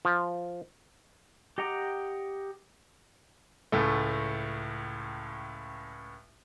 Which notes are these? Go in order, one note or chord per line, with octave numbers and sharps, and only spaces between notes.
F3
G4 D#5 F#5 A#5 D6
C#2 A2 A3